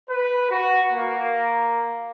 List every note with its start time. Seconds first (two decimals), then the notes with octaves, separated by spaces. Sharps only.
0.10 B4
0.50 F#4
0.93 A#3